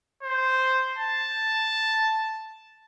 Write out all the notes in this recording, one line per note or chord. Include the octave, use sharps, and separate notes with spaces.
C5
A5